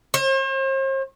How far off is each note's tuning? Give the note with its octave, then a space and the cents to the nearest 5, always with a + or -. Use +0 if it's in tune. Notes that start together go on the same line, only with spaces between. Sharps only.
C5 +45